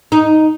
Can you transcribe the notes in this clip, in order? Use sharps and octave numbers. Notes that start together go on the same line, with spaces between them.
D#4